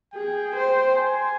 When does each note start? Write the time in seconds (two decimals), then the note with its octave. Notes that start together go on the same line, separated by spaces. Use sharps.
0.14 G#4 G5
0.56 C5
0.97 G#5